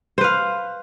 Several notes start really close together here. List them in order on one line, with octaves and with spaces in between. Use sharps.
C5 B4 F5